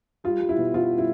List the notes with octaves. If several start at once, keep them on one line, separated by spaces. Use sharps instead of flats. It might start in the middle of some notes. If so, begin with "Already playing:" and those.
G3 F4
G3
E4
B2
B2 F4
G3
E4